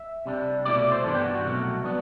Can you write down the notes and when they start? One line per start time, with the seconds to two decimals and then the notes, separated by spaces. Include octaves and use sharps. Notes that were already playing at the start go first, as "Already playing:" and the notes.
Already playing: E5
0.26 C3 G3 D4
0.65 C2 B2 A3 E4 D5
0.79 D5
0.92 C5
1.04 G2 E3 B3 D4 A4
1.14 G4
1.24 F#4
1.34 F#4
1.45 C2 B2 F#3 A3
1.84 F#3 B3 D4